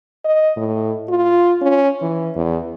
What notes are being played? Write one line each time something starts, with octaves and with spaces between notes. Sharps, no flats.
D#5
A2
F4
C#4
E3
E2